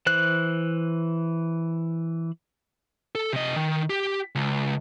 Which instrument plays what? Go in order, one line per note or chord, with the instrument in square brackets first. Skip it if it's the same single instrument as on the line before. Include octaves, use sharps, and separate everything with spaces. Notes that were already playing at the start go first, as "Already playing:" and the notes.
[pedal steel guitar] E3 C5 F#6
[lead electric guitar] A4
C3 D#5
D#3
G4
C#2